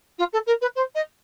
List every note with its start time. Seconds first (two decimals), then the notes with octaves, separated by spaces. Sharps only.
0.18 F4
0.33 A4
0.46 A#4
0.61 B4
0.75 C5
0.95 D#5